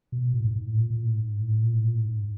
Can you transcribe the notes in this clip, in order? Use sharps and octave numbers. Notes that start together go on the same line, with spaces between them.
B2
A2
G#2
G#2
A2
A#2
A#2
A2
G#2
A2
A#2
A2
A#2
A2
G#2